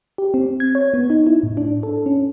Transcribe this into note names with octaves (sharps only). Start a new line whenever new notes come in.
G4
C4
G#6
C#5
B3
D#4
E4
A2
D4
A4
C#4